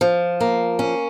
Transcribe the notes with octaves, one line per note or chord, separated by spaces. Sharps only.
F3
A#3
C#4